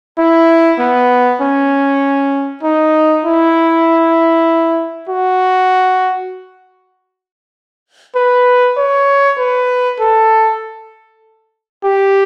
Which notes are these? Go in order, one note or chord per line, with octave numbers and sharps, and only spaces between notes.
E4
B3
C#4
D#4
E4
F#4
B4
C#5
B4
A4
G4